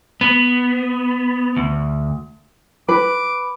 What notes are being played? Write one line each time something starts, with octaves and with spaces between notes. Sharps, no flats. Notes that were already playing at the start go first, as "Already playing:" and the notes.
B3
D2
B4 D6